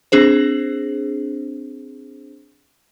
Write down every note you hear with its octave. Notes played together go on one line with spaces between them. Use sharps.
C4 D4 G#4 C5